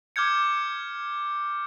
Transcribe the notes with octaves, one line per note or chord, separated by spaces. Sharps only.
D6 F6 G6 G#6 C#7